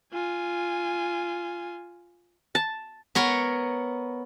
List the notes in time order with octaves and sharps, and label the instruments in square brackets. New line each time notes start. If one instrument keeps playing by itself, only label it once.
[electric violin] F4 G#5
[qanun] A5
[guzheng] B3 A#4 C#5